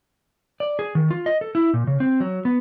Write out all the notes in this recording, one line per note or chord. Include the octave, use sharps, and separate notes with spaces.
D5
G#4
D#3
F4
D#5
A4
E4
A#2
C#3
C4
F#3
B3